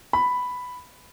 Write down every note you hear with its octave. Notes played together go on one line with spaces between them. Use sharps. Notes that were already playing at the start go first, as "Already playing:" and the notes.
B5